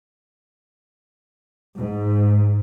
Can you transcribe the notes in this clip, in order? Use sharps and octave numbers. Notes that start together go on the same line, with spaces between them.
G#2